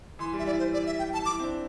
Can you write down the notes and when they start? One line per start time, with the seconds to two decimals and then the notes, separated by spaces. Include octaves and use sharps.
0.19 E3 C6
0.33 G3
0.39 E5
0.46 E4 D5
0.59 C5
0.72 E4 D5
0.86 E5
0.99 G5
1.13 A5
1.25 E4 D6
1.39 C4
1.43 D4